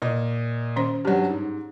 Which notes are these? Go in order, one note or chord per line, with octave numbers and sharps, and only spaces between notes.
A#2 D#5
D#3 C#4 C5
G2 F#3 G4
G#2